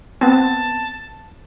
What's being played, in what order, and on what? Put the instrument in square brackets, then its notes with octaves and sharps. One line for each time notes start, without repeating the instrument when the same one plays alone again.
[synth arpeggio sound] B3 C4 [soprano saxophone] A5